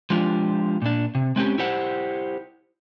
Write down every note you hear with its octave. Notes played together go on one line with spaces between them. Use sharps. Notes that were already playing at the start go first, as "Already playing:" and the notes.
F3 G#3 D4 F4 G4
A#2 D4
C3
G#3 C4 C#4 G4
E4 G4 C5 F#5